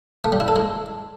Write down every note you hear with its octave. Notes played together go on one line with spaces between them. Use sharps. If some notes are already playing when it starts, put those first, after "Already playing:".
A3
G3
E4
A4
G#3